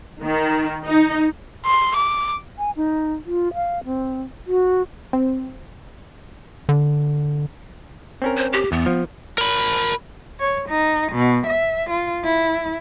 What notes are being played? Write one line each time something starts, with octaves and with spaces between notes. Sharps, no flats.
D#3
D#4
C6
D6
G#5
D#4
F4
F5
C4
F#4
C4
D3
C4 C#4 A#4
C5
G4
E2 B3
F3
A#4 B5
C#5
D#4
B2
E5
F4
E4